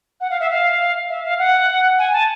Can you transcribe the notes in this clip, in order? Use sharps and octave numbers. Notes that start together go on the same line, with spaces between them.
F#5
F5
E5
F5
E5
F5
F#5
G#5
A5